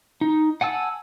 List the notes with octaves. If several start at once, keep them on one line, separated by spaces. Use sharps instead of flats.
D#4
F#5 G#5 A5 E6